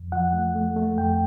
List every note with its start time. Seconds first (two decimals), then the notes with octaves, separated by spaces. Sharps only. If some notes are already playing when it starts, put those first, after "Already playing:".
Already playing: F2
0.12 F3 F#5
0.33 A3
0.55 A3
0.76 A3
0.98 F2 G5